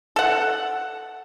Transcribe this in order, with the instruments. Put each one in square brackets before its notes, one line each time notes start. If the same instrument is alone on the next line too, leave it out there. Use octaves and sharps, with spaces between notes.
[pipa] A4 F#5